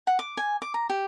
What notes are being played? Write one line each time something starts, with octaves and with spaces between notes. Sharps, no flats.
F#5
D6
G#5
D6
A#5
G4